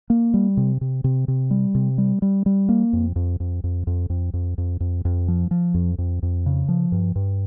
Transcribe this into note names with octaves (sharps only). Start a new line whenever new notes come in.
A#3
G3
C3
C3
C3
C3
G3
C3
G3
G3
G3
A#3
F2
F2
F2
F2
F2
F2
F2
F2
F2
F2
F3
F3
F2
F2
F2
C#3
F3
G2
G2